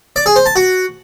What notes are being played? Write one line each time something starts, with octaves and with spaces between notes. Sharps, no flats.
D5
G#4
C5
A5
F#4